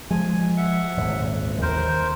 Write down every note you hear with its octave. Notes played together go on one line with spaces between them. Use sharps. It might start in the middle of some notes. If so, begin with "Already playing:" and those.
F3 G#3 G#5
E5 F#5
D#1 G#1 D2
D#2 A#4 C5